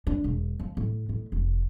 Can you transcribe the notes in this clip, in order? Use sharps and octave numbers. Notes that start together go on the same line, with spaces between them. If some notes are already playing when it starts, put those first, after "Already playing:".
D4
E1
F3
A2
A2
F1